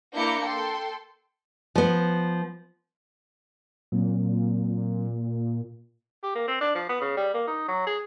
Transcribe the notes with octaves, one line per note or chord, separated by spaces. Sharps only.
A#3 D4 E4 D6 G6 C#7
A4 G5 C6
F3 B3
A#2 F#3 A#3 C4
G4
A#3
C4
D4
F3
B3
C#3
G3
A#3
D#4
F#3
G#4